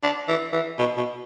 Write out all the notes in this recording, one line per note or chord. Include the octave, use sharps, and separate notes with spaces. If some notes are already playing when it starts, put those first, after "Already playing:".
D4
E3
E3
B2
B2